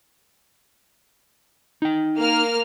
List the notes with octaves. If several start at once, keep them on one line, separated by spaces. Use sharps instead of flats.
D#4 G5
A#3 F6